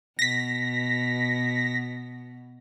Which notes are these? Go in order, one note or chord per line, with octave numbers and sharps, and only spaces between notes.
B2 A#6 B6